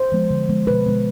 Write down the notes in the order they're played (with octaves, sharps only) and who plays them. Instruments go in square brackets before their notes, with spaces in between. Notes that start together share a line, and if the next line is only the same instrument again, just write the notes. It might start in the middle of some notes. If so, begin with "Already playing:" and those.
Already playing: [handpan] C5
F3 G#3 B3
D3
F3 G#3 B3
B2 B4
G#3 B3